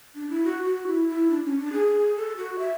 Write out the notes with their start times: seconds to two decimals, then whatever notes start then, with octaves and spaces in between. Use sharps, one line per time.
0.15 D4
0.30 E4
0.45 F#4
0.66 F#4
0.87 E4
1.08 E4
1.30 D4
1.44 C#4
1.59 D4
1.73 G#4
2.16 A4
2.37 F#4
2.59 E5